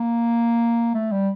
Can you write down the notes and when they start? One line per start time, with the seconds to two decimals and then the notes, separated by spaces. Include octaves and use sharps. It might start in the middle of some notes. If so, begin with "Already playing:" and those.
Already playing: A#3
0.95 A3
1.12 G3